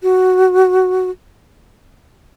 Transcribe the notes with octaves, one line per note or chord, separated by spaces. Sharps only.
F#4